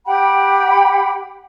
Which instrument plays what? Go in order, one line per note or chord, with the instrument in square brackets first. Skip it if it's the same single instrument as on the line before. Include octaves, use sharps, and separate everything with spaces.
[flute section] G4 F#5 G5 B5